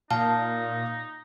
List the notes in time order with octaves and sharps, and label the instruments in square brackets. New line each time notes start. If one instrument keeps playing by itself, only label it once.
[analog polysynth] A#2 [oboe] D#4 [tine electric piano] F5 [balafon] A5